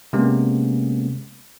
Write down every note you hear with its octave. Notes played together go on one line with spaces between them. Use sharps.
C3 G#3 A#3 B3 C#4